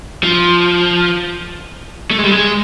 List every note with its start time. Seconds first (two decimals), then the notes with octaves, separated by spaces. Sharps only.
0.23 F3
2.11 A3
2.18 G#3
2.24 G3
2.31 G#3